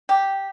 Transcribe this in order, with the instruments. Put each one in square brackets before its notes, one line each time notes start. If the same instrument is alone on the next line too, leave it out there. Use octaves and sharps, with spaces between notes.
[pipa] G4